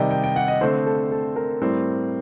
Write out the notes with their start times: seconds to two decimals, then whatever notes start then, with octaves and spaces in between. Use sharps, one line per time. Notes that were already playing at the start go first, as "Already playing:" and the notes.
Already playing: C3 D#3 G3 D5 D#5 G5
0.11 G5
0.23 G5
0.36 F#5
0.48 D#5
0.61 D3 A3 C4 C5
0.86 A4
1.11 A4
1.36 A#4
1.62 A2 G3 C4